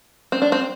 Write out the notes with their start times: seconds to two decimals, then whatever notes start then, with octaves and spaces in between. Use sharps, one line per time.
0.32 C4
0.42 D4
0.52 C4